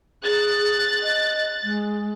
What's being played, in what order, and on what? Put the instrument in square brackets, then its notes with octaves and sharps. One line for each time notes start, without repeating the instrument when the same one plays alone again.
[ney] G#4 [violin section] F#6 A6
[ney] D#5
G#3